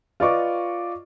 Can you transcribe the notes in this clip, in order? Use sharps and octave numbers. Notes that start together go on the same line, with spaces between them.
F4 B4 D5 D#5 C#6 D6